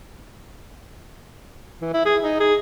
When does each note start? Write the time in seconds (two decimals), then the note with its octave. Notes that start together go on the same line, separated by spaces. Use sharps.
1.81 E3
1.94 E4
2.05 G#4
2.22 D#4
2.40 G#4